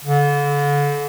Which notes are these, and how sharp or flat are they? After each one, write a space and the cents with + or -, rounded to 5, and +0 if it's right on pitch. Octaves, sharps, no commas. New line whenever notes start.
D3 -35